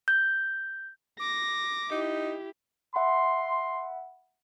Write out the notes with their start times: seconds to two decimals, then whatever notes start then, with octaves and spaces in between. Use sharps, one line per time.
0.08 G6
1.20 D6 A#6
1.91 D#4 E4 G4
2.95 E5 F#5 B5 C6